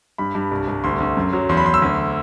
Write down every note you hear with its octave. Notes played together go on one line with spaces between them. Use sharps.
G2 B5
G2
C2
C2
D2 C6
D2
F#2
F#3
E2 C6
B5
E2 C6
E6
D2